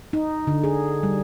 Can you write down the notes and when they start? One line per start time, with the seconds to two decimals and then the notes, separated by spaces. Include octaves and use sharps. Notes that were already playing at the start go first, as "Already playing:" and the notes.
0.13 D#4
0.47 D3
0.64 G#4
1.03 G3